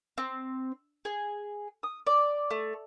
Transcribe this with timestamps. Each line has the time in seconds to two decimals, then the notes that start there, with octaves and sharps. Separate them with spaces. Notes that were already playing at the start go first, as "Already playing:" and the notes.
0.18 C4
1.05 G#4
1.83 D#6
2.07 D5
2.50 A3